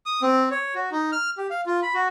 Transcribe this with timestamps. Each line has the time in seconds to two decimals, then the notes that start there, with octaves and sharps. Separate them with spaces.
0.06 D#6
0.22 C4
0.51 C#5
0.75 F#4
0.92 D#4
1.12 F6
1.38 G4
1.50 F5
1.66 F4
1.83 B5
1.94 F#4